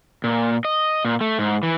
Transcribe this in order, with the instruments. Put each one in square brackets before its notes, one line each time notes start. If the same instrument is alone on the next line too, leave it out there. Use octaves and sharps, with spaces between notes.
[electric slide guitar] A#2
D#5
A#2
A3
G#2
E3